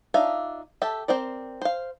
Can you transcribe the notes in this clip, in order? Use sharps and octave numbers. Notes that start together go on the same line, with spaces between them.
D4 D#4 F4 E5 F5
G4 A4 E5
C4 A#4 C5 D5
C5 F5